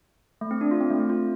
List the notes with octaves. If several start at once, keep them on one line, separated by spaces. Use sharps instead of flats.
A3
C4
D4
F4
C4
A3
C4
F4